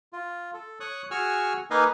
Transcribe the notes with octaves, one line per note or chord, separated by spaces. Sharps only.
F4
A4
C#5 C#6 D#6 F#6
F#4 G#4 G#5 C#6 E6 F6
A#3 D#4 B4 D#5 F5 G#5